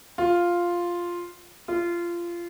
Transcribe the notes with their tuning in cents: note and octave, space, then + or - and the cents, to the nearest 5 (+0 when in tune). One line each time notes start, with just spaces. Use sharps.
F4 +0
F4 -20